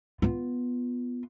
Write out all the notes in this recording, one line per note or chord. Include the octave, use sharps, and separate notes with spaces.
B3 F4